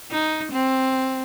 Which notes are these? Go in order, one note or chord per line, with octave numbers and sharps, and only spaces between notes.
D#4
C4